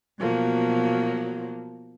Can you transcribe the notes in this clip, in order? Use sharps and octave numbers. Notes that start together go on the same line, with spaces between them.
B2 F3 F#3 A#3